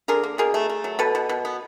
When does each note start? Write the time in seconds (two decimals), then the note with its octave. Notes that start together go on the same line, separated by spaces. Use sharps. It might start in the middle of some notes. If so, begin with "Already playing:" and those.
0.08 D3 G#4 A#4
0.24 A#3
0.38 B2 G#4 A#4
0.54 A3
0.69 A3
0.84 F#3
0.99 B2 A4 B4
1.15 B2
1.29 B2
1.45 B3